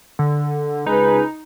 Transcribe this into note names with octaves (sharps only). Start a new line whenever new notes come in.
D3
C#2 D#4 G#4 B4